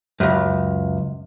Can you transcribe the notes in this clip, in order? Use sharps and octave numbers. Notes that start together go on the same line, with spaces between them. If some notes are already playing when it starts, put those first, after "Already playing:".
C#2 F#2